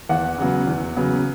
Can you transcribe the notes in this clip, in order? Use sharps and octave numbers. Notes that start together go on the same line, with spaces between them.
E2 F#5
C#3 F#3 B3
E2
C#3 F#3 B3